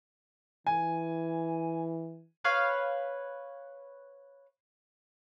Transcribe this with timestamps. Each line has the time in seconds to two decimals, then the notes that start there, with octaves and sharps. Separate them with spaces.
0.67 E3 G#5
2.45 B4 C#5 F5